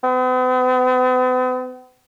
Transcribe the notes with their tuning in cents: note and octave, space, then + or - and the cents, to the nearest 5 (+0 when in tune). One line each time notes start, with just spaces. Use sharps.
B3 +45